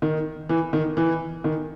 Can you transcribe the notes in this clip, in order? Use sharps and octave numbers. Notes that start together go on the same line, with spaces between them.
D#3
E3
D#3
E3
D#3